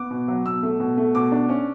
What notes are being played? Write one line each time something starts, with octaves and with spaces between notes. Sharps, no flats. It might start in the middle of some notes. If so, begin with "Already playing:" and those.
Already playing: B3 D6
B2
F#3
B2 E6
A3
B2
A3
B2 D6
D4
C#4